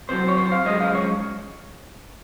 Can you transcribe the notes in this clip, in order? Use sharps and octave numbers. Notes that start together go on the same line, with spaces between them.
C3 F#3 C5
C#5
C5
F5
F#2 F3 G#3 D#5
F5
C#5